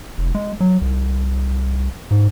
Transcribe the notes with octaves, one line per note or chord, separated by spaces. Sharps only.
F1
G#3
F#3
C2
G#2